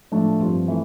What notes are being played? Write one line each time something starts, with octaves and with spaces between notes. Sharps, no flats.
A2 F3 A3 D4
G2 F3 C4 F4
E3 A3